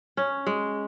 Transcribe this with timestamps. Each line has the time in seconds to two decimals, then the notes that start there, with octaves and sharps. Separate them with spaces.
0.17 C#4
0.46 G#3